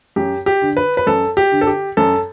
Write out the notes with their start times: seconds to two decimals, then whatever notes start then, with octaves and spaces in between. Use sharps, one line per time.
0.16 F#2 G4
0.46 G4
0.62 D3
0.77 B4
0.97 B4
1.07 F#2 A4
1.37 G4
1.52 D3
1.61 A4
1.67 G4
1.97 F#2 A4